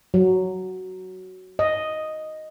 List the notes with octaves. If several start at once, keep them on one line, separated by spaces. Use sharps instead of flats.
F#3
D#5